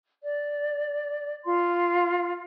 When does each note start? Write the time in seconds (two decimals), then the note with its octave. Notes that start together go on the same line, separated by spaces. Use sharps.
0.23 D5
1.45 F4 C6